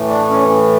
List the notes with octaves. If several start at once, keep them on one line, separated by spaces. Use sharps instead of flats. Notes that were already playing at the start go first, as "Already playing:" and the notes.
Already playing: A2 E3 A3
D4
C#4